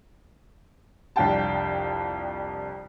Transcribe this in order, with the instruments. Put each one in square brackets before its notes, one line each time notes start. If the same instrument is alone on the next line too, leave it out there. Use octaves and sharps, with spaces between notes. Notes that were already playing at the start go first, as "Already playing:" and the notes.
[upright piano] C2 F2 D4 F5 G5 A5